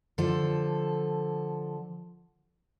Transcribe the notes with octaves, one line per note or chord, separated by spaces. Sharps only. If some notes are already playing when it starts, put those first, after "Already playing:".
D3 F3 A4